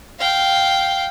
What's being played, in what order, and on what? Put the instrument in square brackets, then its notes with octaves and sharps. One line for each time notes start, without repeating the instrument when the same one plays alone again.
[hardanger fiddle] F5 G5